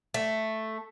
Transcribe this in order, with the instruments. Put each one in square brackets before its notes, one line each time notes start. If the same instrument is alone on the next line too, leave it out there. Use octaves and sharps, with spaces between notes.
[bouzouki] A3